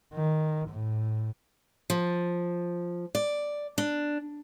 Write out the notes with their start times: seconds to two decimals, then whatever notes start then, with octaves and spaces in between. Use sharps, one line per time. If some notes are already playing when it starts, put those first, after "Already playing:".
0.14 D#3
0.68 A2
1.90 F3
3.15 D5
3.78 D4